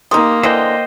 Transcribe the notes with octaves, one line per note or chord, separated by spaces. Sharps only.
A#3 D#4 G4 C6 D#6
D3 E3 C5 D#5 G5